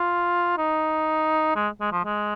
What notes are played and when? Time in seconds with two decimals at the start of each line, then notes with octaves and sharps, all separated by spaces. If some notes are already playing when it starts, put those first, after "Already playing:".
Already playing: F4
0.58 D#4
1.56 G#3
1.81 G#3
1.92 F3
2.05 G#3